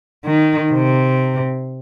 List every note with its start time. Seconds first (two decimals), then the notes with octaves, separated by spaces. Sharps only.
0.26 D#3
0.73 C3